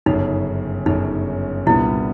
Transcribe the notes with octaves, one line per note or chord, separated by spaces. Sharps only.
G1 F#2 C#3 D#4
G1 F#2 C#3 D#4
C2 A#2 G3 B3 D4 E4